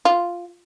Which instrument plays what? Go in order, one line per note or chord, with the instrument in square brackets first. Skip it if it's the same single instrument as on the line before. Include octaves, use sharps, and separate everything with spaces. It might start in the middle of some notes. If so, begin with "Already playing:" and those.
[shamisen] F4